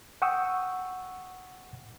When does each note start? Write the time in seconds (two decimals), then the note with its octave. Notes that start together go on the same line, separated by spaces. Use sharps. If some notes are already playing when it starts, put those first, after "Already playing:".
0.22 F#5 G5 C#6 D#6 E6